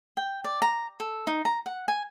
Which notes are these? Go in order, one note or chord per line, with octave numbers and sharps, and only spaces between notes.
G5
D5
A#5
A4
D#4
A#5
F#5
G#5